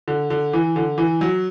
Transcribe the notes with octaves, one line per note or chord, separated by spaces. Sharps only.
D3
D3
E3
D3
E3
F#3